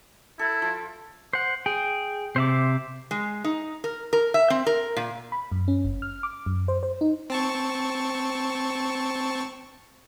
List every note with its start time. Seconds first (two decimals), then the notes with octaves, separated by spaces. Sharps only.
0.39 E4 A4
0.62 F3
1.33 C5 F#5
1.66 G#4 G5
2.36 C3 C5 E5 D6
3.11 G#3
3.44 D#4
3.84 A#4
4.13 A#4
4.34 E5
4.50 C4
4.66 A#4
4.97 A#2
5.32 B5
5.52 F#2
5.68 C#4
5.85 G1
6.02 F6
6.23 D6
6.46 F#2
6.68 C5
6.83 C5
7.01 D#4
7.30 C4 A5 C#6